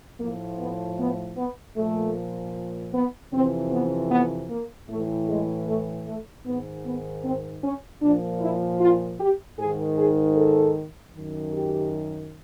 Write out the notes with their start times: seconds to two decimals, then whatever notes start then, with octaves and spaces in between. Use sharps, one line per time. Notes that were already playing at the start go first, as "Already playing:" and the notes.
0.20 A2 F3 A#3
0.59 B3
0.99 B3
1.37 B3
1.77 A#2 F3 A3
2.94 B3
3.33 F2 C3 E3 C4
3.72 B3
4.11 B3
4.50 A#3
4.90 A2 E3 A3
5.28 G#3
5.68 A3
6.07 A3
6.46 G#2 D#3 B3
6.86 B3
7.24 C4
7.64 C#4
8.02 A#2 F3 D4
8.41 E4
8.81 F4
9.20 G4
9.59 G#2 D#3 G#4
9.98 G#4
10.37 A4
11.15 F#2 D#3
11.54 G4